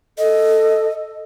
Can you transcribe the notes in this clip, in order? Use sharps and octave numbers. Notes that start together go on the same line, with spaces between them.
A4 D#5